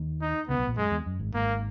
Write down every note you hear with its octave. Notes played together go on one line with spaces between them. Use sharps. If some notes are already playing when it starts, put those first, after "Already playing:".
Already playing: D#2 D#3
D#4
C#2 C#3 B3
B1 B2
A#1 A#2
F#2 G#3
E2
F#2
G#1 G#2
G#1 G#2 A#3